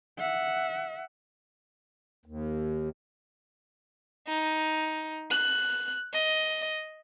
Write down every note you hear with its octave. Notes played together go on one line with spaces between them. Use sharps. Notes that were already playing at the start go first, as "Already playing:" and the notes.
E5 F#5
D#2
D#4
F#6
D#5